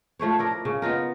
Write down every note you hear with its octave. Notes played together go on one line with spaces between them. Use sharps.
F3 A3 C5 C#5
E4 A#4 D5
C#3
B3 D#4 F4 A#4